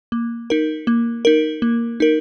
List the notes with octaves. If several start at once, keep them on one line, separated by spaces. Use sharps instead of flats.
A#3
D#4 A#4
A#3
D#4 A#4
A#3
D#4 A#4